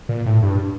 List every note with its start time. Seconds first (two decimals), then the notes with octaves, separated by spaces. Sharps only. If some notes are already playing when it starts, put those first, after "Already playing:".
0.09 A#2
0.26 A2
0.43 G2